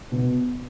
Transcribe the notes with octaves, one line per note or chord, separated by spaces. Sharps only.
B2